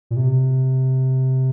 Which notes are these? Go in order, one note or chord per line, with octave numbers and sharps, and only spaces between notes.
A#2
C3